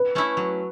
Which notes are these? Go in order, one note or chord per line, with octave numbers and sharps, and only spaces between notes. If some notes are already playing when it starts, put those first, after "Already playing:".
Already playing: B4
A3 C#4 E4
F#3